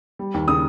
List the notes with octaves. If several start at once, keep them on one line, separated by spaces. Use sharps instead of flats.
G3
D#2
C#3 D#6